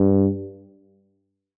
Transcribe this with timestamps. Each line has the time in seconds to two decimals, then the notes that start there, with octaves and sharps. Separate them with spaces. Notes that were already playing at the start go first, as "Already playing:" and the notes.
Already playing: G2